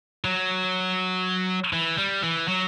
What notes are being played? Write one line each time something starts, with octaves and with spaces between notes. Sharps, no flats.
F#3
E3
G3
E3
F#3